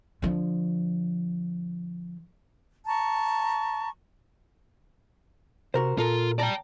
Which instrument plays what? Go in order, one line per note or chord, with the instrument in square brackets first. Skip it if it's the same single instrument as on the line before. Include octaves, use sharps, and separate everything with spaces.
[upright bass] D3 F3
[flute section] A5 A#5 C#6
[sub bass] C3 [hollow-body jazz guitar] F#4 A#4 C5
[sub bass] A#2 [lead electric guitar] F4 [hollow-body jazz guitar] A4 A#4
[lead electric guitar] D5 G5 [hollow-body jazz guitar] A5 A#5